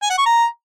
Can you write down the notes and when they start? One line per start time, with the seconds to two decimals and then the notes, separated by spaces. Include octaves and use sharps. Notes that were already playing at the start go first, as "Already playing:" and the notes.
0.02 G#5
0.10 F#5
0.18 C#6
0.26 A#5